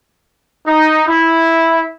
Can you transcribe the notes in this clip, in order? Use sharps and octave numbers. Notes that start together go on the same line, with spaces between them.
D#4
E4